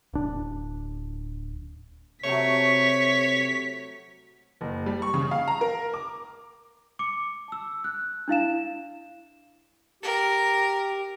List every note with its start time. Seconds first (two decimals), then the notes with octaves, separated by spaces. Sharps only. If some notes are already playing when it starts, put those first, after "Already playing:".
0.13 D1 D4
2.24 C3 F#3 A3 C#5 B6
4.61 F#1
4.86 G3
5.02 C#6
5.14 C#3
5.31 F5
5.48 A#5
5.61 A#4
5.94 D6
6.99 D6 C#7
7.48 A5 E6
7.84 F#6
8.28 D4 E4 F5 E7
10.03 G4 A#4